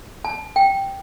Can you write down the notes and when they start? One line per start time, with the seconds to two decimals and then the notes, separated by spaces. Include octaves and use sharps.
0.25 A5
0.56 G5